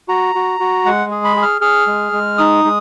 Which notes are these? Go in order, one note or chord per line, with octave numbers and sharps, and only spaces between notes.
F#4 A#5
F#4
F#4
G#3 F#5
G#4
B5
G#4
F6
G#4 F6
G#3
G#3
D#4 D#6
G#3